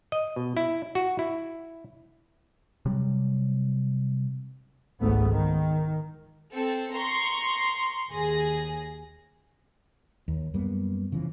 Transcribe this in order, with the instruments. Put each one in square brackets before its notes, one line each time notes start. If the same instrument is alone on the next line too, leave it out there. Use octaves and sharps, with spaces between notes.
[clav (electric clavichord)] D#5
B2
E4
F#4
E4
[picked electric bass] C3 F#3 G3
[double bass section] G#1 C#2 G#2 A3 B3
D#3
[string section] C4 A4
A#5 C6 C#6
D#2 G#4 A#6
[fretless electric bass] D#2
F#2 G3 A#3 B3
C#3 E3 F3